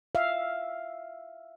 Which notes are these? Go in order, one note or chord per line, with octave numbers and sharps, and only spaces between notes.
E5 F5